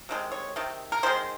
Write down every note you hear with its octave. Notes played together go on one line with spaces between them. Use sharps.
C3 D#3 G#3
C#5
C3 D#3
A#4
D#3 G#3 C5